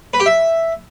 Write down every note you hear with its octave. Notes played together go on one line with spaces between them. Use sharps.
B4
G4
E5